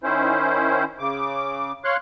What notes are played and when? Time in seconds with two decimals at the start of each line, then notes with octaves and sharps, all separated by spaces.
0.03 D#3 C#4 E4 C5
0.99 C#3 D6
1.84 C#5 F5 C6 F#6